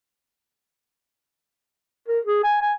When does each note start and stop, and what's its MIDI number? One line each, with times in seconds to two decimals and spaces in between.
2.08 2.19 70
2.25 2.42 68
2.44 2.56 80
2.61 2.73 80